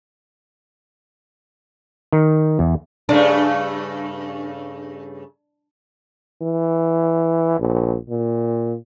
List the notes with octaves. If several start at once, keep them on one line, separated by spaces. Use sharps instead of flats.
D#3
E2
G2 C#3 A3 D4
E3
A#1
A#2